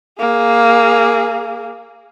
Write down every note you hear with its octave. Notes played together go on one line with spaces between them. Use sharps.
A#3 G#4